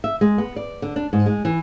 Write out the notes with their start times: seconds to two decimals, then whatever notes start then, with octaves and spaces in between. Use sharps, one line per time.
0.04 E5
0.21 G#3
0.38 B3
0.56 D5
0.82 D3
0.96 D4
1.13 G#2
1.26 G#3
1.45 E3